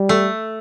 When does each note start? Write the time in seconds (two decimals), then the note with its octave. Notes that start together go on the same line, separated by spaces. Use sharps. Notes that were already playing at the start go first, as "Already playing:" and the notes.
Already playing: G3
0.09 A3